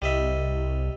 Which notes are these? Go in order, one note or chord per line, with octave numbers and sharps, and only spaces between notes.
C2 G3 D#5 E5